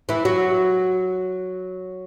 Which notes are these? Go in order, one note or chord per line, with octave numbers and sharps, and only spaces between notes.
E3 E4
F#3 F#4